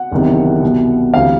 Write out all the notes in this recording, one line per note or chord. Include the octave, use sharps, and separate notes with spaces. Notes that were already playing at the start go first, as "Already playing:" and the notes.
Already playing: F#5
F#1 E2 C3 D#3
C2 B2
D2 C3 E3 F5